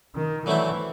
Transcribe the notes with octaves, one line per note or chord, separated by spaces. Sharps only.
D#3
D3 E3 F#3 A3 C4 E4